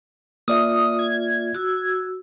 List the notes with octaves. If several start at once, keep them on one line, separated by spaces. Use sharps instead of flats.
A#3 F4 D5 E5 D#6
G#6
F#4 E6